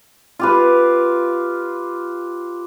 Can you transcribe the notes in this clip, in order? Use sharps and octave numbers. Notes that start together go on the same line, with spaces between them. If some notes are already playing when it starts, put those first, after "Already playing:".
F4 G4 B4